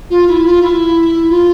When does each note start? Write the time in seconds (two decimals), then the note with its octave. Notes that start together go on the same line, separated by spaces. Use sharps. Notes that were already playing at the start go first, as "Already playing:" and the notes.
0.10 F4
0.28 E4
0.44 F4
0.62 E4
1.29 F4